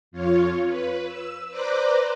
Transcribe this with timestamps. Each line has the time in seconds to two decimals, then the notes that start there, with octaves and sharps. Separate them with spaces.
0.11 F2 F4 C#5
0.67 B4
1.06 E6
1.50 B4 C5 D5 A#5 D6 F#6